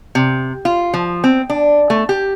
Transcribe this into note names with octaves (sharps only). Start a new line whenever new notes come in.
C3
F4
F3
C4
D4
A3
G4